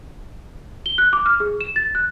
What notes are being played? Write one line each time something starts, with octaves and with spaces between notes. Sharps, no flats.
G7
F#6
D6
F6
G#4
E7
A6
F#6